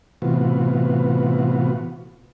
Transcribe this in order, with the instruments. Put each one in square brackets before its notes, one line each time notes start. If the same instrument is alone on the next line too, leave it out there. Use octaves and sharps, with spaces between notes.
[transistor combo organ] A2 C3 E3 B3 F4 F#4